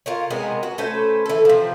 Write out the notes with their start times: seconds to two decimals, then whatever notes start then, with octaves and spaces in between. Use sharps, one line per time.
0.06 F4 A#4 C#5
0.30 C3 G#3 B3 A#4
0.63 F#4
0.78 A3 C#4 B4 C5
1.26 E3 A4
1.45 C3 F3